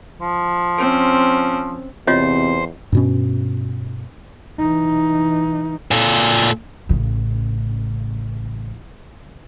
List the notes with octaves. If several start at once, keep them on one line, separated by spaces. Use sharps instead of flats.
F3
C4 C#4
E2 C3 F4 C5 C#5 D#5
G2 B2 C#4
E3 D#4
A#2 A4
A1 C#3